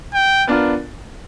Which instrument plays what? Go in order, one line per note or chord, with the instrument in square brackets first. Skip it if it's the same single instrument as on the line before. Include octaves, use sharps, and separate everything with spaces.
[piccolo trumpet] G5
[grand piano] B3 D4 F4 A#4